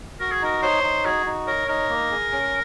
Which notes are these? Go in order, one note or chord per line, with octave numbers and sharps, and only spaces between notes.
F#4 A#4
G#4
D#4 A#4
C5 C#5
D#4
F#4 G#4
D#4
A#4 C#5
D#4 A#4
A#3
G#4
C#4